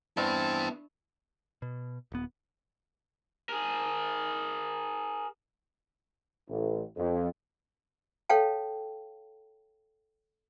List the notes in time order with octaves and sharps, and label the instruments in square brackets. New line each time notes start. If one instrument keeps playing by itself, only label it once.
[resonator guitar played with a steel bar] G2 [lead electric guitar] B3 E4 [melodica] C4 A5
[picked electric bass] B2
D#1 B3
[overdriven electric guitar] G#4 A#4
[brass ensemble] A1
F2
[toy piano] A4 C#5 F5 G5 A5